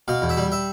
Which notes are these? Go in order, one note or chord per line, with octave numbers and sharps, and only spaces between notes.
B2 F5
E2
E5
G3
E5